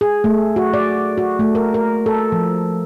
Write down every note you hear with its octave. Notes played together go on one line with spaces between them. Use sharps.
G#4
A3
F#4
D5
F#4
A3
A#4
A#4
A4
F3